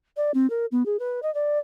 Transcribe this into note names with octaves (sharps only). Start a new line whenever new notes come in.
D5
C4
A#4
B3
G#4
B4
D#5
D5